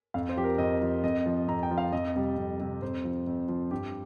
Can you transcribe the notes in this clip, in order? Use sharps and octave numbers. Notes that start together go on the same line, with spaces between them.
F2 F5
C5
F3 G4
A#4
F2 D#5
F3
F2 D#5
F3
F2 A#5
G5
F3
F5
F2 D#5
C3 G3
F2
C3 G3
F2 C5
F3
F2
F3
G2 G4